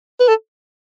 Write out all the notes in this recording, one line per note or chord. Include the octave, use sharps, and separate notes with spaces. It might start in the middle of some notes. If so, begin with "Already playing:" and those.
B4
A4